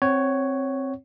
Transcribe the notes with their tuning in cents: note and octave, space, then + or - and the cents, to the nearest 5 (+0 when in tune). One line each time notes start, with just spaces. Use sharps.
C4 +10 C#5 +0 F#5 +30